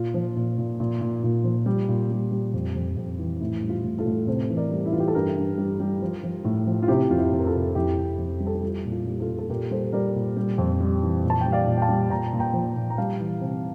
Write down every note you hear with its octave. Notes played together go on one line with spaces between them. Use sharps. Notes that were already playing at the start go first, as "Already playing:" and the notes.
Already playing: A#2 F4
F3
A#2
A#2
A#2
A#2
A#2
F3
G3
A#2
G3
G3
F2
F2
F2
E3
A2 E4
G3
F4
A2
F4 A4
A2
C3 A4 C5
E3
A#4 D5
G3
E4
E3 F4
G4
A4
G2 G4 A#4
G2
G3
G3
F3
F3
A2
F3
F4
C3 E4 G4
F2 F4
E4 G4
F2
A#4
F4 A4
C3
F2 E4 G4
F2
F2
G3
A4
G4
G3 F4
A#2
F4
G3
F4 A4
A#2
A4
A#2 G4 A#4
G3 A4 C5
G3 A#4 D5
A#2
G3
F2
G3
E3
A#2
A5
G3 G5
D5 F5
A#2
G5
F5 A5
G3
A#2 G5 A#5
A#2
G5 A#5
F3
A#2
A#5
G3 F5 A5
E3
C3